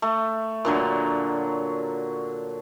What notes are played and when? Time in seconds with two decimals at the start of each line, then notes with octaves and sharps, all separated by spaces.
0.02 A3
0.65 A#2 D3 F#3